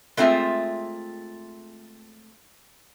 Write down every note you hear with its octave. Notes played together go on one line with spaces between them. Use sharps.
G#3 A3 C4 F4 G#4 E5